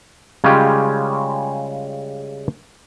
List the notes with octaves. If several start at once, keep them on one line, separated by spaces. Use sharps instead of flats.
C#3 G3 G#3 C#4 F4 G4